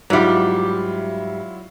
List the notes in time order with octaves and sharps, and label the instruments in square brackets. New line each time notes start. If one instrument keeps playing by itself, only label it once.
[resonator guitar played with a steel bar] G#2 G3 [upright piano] F#3 E4 F4